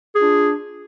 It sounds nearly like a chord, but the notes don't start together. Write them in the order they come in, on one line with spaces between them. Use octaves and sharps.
G#4 D4 F4